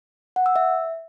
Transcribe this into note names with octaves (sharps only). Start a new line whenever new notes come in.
F#5
E6
E5